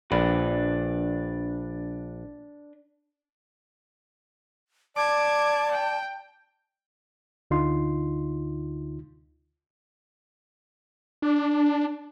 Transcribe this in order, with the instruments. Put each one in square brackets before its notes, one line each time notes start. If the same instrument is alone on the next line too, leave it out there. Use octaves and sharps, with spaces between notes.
[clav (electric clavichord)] A#1 [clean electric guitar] D4 B4
[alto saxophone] D5 [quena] A5 [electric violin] D6 G#6
[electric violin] G5
[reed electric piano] D2 D3 D#4 F4 C6
[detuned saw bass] D4